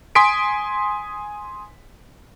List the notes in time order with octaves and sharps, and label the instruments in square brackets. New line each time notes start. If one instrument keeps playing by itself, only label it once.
[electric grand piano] G#5 C6 D#6 B6 D7